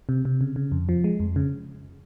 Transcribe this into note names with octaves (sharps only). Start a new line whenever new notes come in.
C3
C3
C#3
C#3
F2
F3
G#3
F2
C#3